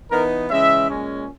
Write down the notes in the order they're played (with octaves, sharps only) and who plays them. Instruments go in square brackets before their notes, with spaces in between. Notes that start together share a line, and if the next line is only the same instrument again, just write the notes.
[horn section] E3 B3 D#4 A#4
C#3 E3 G#3 C#4 E5
A#2 G#3 C#4